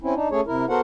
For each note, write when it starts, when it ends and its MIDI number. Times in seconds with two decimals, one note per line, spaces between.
0.01 0.14 60
0.01 0.14 61
0.01 0.14 64
0.15 0.28 62
0.15 0.28 63
0.31 0.41 57
0.31 0.41 61
0.31 0.41 68
0.31 0.41 73
0.46 0.65 48
0.46 0.65 64
0.46 0.65 70
0.69 0.81 59
0.69 0.81 66
0.69 0.81 69
0.69 0.81 70
0.69 0.81 72
0.69 0.81 78